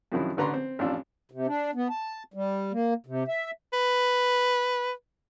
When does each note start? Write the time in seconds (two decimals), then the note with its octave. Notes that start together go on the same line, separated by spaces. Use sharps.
0.12 F#2 C3 D#3 F3 F#3 E4
0.37 A1 D3 B4 A#5 C6 C#6
0.54 C4
0.79 A1 F2 D4 F4 E6
1.31 C3
1.47 D4
1.75 B3
1.90 A5
2.34 G3
2.72 A#3
3.06 C3
3.28 E5
3.73 B4